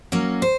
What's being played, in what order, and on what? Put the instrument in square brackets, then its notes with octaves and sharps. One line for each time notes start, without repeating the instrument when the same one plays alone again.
[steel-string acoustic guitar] F#3 A#3 C#4
C5